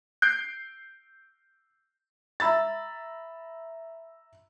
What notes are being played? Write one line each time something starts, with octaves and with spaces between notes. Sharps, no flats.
G6 C7 D7
E5 A#5 B5 E6 A6